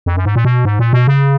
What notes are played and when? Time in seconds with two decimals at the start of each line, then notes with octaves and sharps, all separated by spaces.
0.06 F2
0.17 F#2
0.25 G#2
0.36 A#2
0.45 B2
0.65 G#2
0.79 A#2
0.93 B2
1.07 C#3